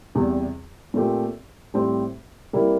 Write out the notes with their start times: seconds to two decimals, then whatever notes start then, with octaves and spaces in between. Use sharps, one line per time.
0.15 E2 C3 G3
0.94 A#2 A3 C4 G4
1.74 A2 G3 C4 G4
2.53 C3 G3 A#3 E4